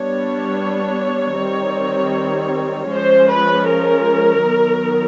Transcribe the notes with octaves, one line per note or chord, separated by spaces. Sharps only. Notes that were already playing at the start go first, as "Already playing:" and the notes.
Already playing: G3 B3 D4 C#5
D#3 G3 C4
F3 G#3 C#4 C5
B4
A#4
D#3 F#3 B3